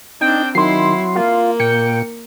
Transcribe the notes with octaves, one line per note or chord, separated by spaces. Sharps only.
C4 D4 D#4 G5
D#3 F#3 E4 C6 C7
A#3 F4
A#2 G5 C#7